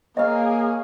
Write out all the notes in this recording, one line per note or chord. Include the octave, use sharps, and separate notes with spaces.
A#3 G#4 C#5 D#5 F5